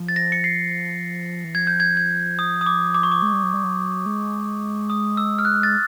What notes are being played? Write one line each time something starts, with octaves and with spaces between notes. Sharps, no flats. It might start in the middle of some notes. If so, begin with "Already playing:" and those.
Already playing: F3
A6
A#6
C#7
C7
E3
F3 G#6
G6
G#6
G#6
D#6
D#6
D6
D6
C#6
D6
G#3
G3
F#3
G3
F#3
G#3
D#6
E6
F6
F#6
A6